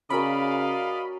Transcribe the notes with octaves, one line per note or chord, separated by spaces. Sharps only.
C#3 C#4 F#4 A#4 D5 D#5 F5 B5